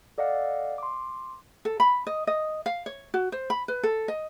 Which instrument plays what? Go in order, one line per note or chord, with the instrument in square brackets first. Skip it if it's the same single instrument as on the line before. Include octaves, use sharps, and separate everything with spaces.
[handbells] A4 D5 D#5 F5 F#5
C6 D6
[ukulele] A4
B5
D#5
D#5
F5
C#5
F#4
C5
B5
B4
A4
D#5